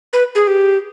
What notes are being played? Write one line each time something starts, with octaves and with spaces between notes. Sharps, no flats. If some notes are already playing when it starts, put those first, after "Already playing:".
B4
G#4
G4